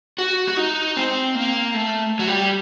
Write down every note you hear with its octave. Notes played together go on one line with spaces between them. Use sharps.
F#4
F#4
D#4
C4
A#3
A3
F#3
G3